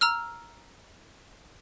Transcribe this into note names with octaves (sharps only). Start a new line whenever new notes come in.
A#5 E6 F6